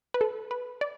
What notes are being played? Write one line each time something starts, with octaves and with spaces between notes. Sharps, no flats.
B4
A4
B4
D5